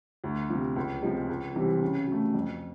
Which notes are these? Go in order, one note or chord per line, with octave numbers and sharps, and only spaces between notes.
D2
C3 F3
C#2
C3 F3 G#3
C#2
C3 E3 G3 C4
C#3
F#3 A3
F2